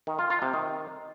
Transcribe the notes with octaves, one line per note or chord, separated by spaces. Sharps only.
D#3
F4
F4
C3
D#3